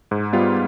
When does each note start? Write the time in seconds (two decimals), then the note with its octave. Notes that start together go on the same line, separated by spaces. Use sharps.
0.11 G#2
0.33 G3 B3 F4